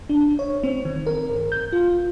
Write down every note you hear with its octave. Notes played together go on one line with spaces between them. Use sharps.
D4
C#5
C4
D#3
A#4
G1
G6
F4